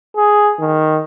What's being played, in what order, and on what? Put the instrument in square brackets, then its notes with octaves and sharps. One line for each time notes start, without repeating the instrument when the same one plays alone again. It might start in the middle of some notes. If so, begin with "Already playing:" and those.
[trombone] G#4
D#3